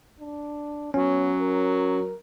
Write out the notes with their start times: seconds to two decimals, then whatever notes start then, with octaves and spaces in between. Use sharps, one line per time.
0.20 D4
0.94 F#3 B3 C#4
1.38 A#4